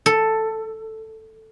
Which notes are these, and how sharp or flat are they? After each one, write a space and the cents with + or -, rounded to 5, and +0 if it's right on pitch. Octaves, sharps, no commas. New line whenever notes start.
A4 +5